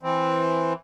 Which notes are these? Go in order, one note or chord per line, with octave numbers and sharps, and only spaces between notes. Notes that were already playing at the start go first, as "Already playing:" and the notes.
E3 C4